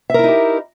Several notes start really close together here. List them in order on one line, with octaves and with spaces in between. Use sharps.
E5 A#4 E4 D#4 G4